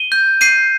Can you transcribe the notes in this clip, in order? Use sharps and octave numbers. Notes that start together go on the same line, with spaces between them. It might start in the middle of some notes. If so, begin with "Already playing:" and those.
Already playing: D#7 G7
G6
G6 C7 D#7